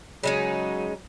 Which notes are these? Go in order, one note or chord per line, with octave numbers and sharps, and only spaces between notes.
C#3 F#3 G#3 D#4